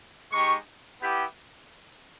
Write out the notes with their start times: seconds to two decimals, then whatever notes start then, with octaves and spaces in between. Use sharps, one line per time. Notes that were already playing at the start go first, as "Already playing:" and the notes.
0.32 G#3 D#4 G4 C#6
1.01 B3 E4 G4